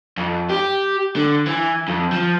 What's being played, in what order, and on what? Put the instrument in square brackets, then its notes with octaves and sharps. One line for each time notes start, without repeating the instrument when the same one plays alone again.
[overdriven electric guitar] F2
G4
D3
E3
F2
F3